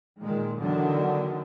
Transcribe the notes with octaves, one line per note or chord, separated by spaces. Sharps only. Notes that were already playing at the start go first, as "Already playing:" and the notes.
A#2 D#3 G#3
E2 D3 D#3 F#3